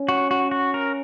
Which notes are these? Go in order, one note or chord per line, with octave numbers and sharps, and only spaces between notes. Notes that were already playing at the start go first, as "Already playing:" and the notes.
Already playing: C#4
F#4
F#4
F#4
A#4